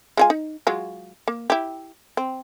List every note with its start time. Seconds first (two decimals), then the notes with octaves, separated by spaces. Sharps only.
0.17 G#3 F4 G#5
0.30 D#4
0.67 F#3 G#3 F4
1.28 A#3
1.50 E4 G4
2.17 C4